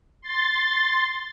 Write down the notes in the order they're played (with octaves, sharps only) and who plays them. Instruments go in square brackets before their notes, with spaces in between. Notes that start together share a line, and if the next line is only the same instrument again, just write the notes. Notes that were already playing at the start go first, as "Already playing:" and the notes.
[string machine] C6 A6